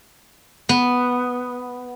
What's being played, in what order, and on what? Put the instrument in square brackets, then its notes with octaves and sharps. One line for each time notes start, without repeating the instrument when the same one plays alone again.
[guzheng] B3